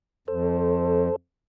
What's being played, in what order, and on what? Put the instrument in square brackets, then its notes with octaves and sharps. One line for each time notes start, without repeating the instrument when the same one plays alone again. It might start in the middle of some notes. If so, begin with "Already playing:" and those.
[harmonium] F2 [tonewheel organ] A4 C5